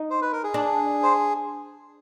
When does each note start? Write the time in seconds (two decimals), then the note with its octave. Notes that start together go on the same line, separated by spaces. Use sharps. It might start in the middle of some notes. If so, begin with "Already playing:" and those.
Already playing: D#4
0.10 C5
0.22 B4
0.33 A#4
0.44 G#4
0.54 D4
1.03 C5